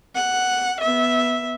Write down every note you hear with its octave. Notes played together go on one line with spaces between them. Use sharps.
F#5
B3 E5